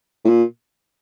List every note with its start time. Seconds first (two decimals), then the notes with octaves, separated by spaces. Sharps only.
0.24 A2
0.28 A#2